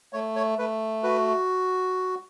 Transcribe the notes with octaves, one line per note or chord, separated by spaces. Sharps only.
A3 C#5
C#5
A3 B4
F#4 B4